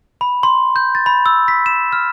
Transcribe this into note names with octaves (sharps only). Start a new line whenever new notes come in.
B5
C6
G6
A6
B5
E6
B6
E7
F6